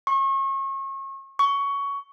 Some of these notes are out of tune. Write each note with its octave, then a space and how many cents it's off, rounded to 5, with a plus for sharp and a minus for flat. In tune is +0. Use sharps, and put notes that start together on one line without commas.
C#6 -35
C#6 +15